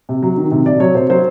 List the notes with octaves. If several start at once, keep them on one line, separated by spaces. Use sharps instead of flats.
C3
F#3
D#3
C3
C3 D5
F#3 C#5
C3 C5
F#3 C5